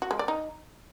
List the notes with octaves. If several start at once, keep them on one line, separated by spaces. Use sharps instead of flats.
F#4
G#3
D5
D#4